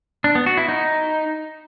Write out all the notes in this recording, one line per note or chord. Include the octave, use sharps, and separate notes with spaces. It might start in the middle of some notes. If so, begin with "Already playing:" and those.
D4
B3
F#4
E4
D#4